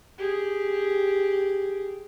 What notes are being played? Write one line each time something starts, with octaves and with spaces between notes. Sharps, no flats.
G4 G#4